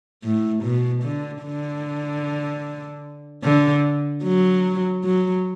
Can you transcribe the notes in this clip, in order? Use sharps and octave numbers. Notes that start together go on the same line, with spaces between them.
A2
B2
D3
D3
D3
F#3
F#3